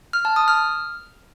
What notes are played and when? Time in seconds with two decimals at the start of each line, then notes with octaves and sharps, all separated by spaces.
0.13 F6
0.25 A5
0.36 D#6
0.48 F6